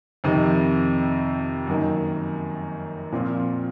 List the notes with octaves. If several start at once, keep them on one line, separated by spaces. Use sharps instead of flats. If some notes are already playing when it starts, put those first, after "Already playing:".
F2 C3 D#3
F#2 D#3 A#3
A#2 F3 C4 F4